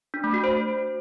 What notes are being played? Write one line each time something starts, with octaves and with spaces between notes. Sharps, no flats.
D4
A3
F#4
C5